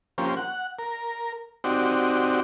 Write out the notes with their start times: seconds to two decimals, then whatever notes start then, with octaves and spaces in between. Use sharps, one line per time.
0.18 F3 A#3 C#4 G4 C5
0.37 F#5
0.79 A#4
1.64 C4 D#4 F#4 G4 D5